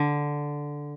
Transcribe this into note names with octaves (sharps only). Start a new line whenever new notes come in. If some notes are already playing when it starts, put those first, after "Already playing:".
Already playing: D3